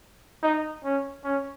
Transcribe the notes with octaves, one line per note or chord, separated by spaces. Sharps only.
D#4
C#4
C#4